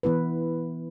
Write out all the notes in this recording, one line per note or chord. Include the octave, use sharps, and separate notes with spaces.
E3 B3 E4 B4